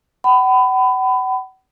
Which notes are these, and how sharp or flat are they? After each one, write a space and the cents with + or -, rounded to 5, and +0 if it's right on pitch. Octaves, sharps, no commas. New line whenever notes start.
F#5 +40 B5 +25